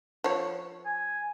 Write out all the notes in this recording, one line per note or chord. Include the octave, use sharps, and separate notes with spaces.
F3 C#5
G#5